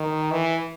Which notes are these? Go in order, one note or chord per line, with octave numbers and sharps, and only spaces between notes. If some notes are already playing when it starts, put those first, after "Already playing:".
Already playing: D#3
E3